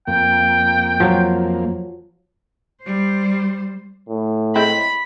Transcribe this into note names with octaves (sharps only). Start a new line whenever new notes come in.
F2 A#3 G5
F3 F#3
G3 C5
A2
G#3 C4 E4 B5